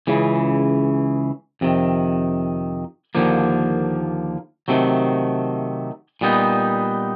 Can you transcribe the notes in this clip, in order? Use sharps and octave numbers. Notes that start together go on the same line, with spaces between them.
C#2 C#3 E3
F2 C3 D#3
D#2 D3 F3 A#3
C3 D#3 F#3 A3
A#2 G3 B3 D#4